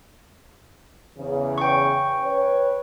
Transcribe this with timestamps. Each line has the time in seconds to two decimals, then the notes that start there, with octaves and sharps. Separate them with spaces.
1.18 E2 C#3
1.58 G5 C#6
2.24 B4 C#5